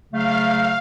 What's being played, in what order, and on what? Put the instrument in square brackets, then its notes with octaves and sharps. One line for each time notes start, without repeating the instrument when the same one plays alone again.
[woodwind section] C#3 F#3 A3 [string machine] F5